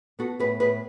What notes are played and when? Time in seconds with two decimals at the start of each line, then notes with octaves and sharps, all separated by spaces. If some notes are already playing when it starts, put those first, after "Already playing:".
0.19 B3 F#4 A4
0.39 A2 G#4 B4
0.60 A2 G#4 B4